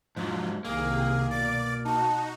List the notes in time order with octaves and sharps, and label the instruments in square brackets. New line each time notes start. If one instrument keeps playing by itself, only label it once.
[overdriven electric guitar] G#2 F#3 [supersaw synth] F3
[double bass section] C2 C3 D#3 [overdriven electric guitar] A#3 [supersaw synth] G#4
[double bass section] B2 [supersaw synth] D5 D6 [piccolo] A6
[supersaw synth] D#4 F#4 [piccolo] A5